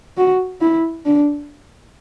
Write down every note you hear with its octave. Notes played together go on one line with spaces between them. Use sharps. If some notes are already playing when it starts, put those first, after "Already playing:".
F#4
E4
D4